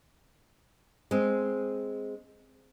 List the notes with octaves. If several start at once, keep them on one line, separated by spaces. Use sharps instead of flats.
G#3 C4